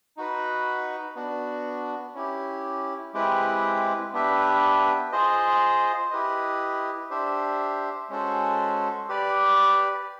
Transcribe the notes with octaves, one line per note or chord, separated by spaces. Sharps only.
D#4 F#4 B4
B3 D4 F#4
C#4 E4 G4
G#3 C4 E4 G4 B4
B3 D4 G4 B4 E5
F4 G#4 C5 D#5
E4 G4 B4 D#5
D4 G4 C5 E5
G#3 C#4 F#4 A4 C5
G4 B4 D5